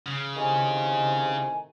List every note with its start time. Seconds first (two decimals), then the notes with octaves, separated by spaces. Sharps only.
0.06 C#3
0.36 A2 C3 D#3 G#5